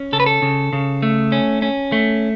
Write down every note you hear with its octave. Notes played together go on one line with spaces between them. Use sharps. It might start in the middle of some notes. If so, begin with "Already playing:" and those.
Already playing: C#4
C#3 A4
B4
A4
C#3
C#3
A3
C#4
C#4
A3